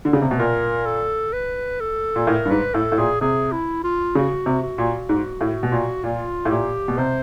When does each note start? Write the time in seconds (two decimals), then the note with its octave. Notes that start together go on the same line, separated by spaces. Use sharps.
0.05 D3
0.13 C#3
0.22 C3
0.31 B2
0.39 A#2 A#4
0.86 A4
1.33 B4
1.80 A4
2.16 A#2
2.27 A2 A#4
2.45 G2
2.50 G#2 B4
2.74 A2 A4
2.92 A2
2.98 A#2 G#4
3.21 C3 G#4
3.52 E4
3.84 F4
4.15 C#3 F#4
4.46 C3
4.63 F#4
4.78 A#2
5.09 G#2
5.41 A2
5.63 B2
5.72 A#2
6.04 A#2 F4
6.45 A2
6.50 A#2 G4
6.88 B2
6.98 C3 C5